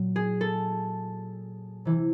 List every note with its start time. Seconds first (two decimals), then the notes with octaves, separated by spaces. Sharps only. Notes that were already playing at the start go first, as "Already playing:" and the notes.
Already playing: A#2 F#3
0.16 G#4
0.41 A4
1.85 C3 E3